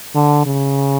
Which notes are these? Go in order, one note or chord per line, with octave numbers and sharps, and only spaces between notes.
D3
C#3